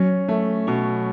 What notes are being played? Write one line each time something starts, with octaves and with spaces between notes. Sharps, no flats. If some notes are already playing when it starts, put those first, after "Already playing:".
Already playing: F#3 C#4
A3
B2 C#4